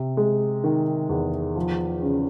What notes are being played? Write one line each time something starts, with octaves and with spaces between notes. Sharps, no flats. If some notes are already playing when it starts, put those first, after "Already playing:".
Already playing: C3
G#3
D#3
E2
F3
C#3